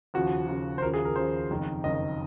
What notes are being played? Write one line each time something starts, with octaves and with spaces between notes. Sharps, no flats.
D#2 C#3 F3 F#4
D#2 C#3 F3
C5
D#2 C#3 F3 A#4
G#4
A#4
D#2 C#3 F3 C5
F#1 F2 D#3
F#1 F2 D#3 D#5